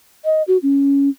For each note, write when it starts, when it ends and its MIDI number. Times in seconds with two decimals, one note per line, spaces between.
0.25 0.43 75
0.48 0.58 66
0.63 1.09 61